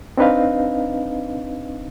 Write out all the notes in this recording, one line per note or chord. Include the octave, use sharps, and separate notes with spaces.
C4 D4 D#4 B4 D#5 F5